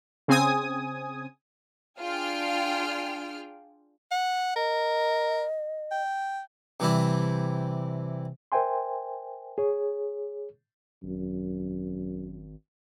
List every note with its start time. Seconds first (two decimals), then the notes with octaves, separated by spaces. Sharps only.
0.28 C#3 C4 G#5 D#6
2.00 D4 F4 G#4 G5 F6
4.11 F#5
4.56 A#4 D#5
5.91 G5
6.80 C3 E3 G3 E4
8.52 A#4 C5 E5 G5 G#5 C6
9.58 G#4 C#5
11.03 G#1 F#2